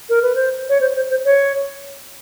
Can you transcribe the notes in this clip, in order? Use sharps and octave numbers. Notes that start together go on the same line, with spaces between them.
A#4
B4
C5
C#5
C5
C5
C5
C#5